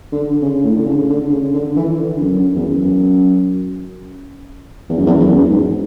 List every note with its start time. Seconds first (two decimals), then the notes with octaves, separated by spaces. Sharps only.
0.12 D3
0.42 C#3
0.64 A2
0.76 D3
0.87 C#3
1.09 D3
1.31 C#3
1.54 D3
1.76 E3
1.99 D3
2.21 F#2
2.55 E2
2.66 F#2
4.90 E2
4.98 F#2
5.06 E2
5.20 F#2
5.27 E2
5.35 F#2
5.49 G#2